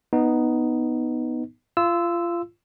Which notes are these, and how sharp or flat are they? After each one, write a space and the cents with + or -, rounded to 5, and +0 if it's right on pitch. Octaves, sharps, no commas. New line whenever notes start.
B3 +0 D#4 +0
F4 -25 E6 +0